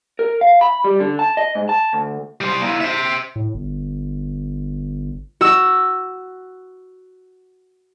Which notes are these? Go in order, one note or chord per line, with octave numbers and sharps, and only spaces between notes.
A#4
F5
B5
G3
D3
A5
D#5
G#2
A5
D2
G3 C5
A#3 E4
C5 E5
A2
G1
F#4 E6